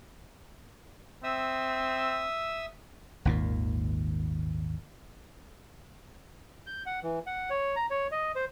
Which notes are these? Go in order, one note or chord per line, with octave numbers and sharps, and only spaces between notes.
C4 E5 D#6 E6
G#1 D#2 A#2
G6
F#5
E3
F#5
C#5
A#5
C#5
D#5
C5